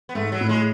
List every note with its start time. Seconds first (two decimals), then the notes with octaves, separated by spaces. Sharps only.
0.09 B3
0.15 G#2 A3
0.32 F#3
0.41 A2
0.49 G#3